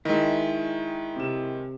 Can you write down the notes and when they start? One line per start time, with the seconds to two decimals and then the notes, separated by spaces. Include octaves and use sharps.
0.05 D#3 G#3 E4 D#5 E5
1.16 C3 E7